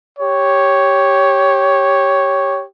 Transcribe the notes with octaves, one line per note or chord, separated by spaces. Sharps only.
G4 C#5